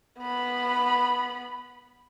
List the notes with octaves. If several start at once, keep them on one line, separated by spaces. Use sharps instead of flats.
B3 B5